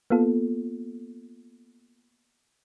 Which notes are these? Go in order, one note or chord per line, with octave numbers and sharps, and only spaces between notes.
A#3 B3 F4 A4